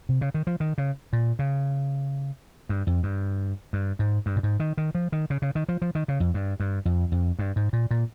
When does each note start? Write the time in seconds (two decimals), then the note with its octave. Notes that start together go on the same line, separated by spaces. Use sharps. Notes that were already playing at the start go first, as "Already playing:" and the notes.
0.09 C3
0.21 C#3
0.34 D#3
0.47 F3
0.60 D#3
0.78 C#3
1.13 A#2
1.39 C#3
2.69 G2
2.87 F2
3.03 G2
3.73 G2
3.99 G#2
4.26 G2
4.36 A#2
4.43 G#2
4.60 D#3
4.77 D#3
4.95 F3
5.12 D#3
5.30 C#3
5.42 C#3
5.55 D#3
5.69 F3
5.82 F3
5.95 D#3
6.08 C#3
6.20 F2
6.34 G2
6.60 G2
6.85 F2
7.12 F2
7.39 G2
7.56 G#2
7.73 A#2
7.91 A#2